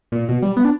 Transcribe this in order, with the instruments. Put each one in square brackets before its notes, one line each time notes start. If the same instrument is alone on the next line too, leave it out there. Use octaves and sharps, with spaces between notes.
[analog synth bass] A#2
B2
G3
B3
D4